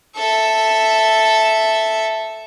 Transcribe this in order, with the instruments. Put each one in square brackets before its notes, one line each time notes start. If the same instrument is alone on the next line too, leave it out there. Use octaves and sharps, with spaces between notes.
[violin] A4 E5